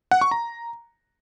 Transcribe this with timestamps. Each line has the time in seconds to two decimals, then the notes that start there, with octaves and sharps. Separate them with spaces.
0.11 F#5
0.21 C#6
0.31 A#5